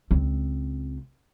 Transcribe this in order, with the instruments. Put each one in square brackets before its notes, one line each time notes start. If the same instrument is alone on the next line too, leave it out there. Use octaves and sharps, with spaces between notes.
[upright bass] C#2 C4